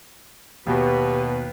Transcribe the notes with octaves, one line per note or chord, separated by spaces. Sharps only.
D#2 B2 G4 B4